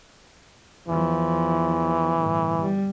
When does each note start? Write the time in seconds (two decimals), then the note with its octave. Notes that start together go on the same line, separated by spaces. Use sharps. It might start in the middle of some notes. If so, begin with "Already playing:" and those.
0.88 E2 E3 F3
2.19 G1 A2
2.61 G3